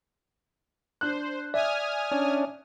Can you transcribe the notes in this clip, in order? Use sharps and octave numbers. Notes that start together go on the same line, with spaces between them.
D4 C5 F#6
D5 E5 G#5 D#6 F6
C#4 D4